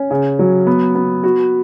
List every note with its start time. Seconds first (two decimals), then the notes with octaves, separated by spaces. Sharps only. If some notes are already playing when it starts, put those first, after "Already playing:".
Already playing: C#4
0.11 C#3
0.39 F#3
0.67 B3
0.95 B3
1.24 F#4